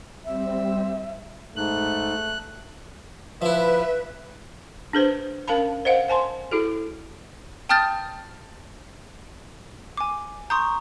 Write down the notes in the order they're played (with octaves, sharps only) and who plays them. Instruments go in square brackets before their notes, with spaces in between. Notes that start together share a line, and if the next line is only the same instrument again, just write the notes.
[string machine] G3 C4 [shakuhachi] E5
[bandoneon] G#2 [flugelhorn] A3 [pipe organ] F#6
[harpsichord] F3 E4 [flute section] B4 [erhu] E5
[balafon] D4 G#4 B4 C5
C#4 A#4 F5 A5 B5
C5 D#5 F5 F#5
C5 G#5 A5 C6
E4 F#4 G#4 A4
[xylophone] G5 A5 D#6 F6 G6 A6
G#5 D6
[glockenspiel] A#5 C#6 [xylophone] C6 D#6 G6